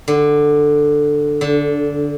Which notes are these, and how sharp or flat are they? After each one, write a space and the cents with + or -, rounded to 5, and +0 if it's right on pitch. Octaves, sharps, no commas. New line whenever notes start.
D3 +10
D3 -15